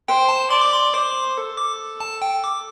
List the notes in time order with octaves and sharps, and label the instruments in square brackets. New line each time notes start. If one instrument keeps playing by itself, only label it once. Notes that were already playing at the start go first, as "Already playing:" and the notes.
[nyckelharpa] C5 [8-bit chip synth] G5
[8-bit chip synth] A5
[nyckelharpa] D5 [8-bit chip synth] C6
[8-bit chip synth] D6
C6
[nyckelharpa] C5 [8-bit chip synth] D6
[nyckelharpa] A4
[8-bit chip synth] D6
A5
G5
D6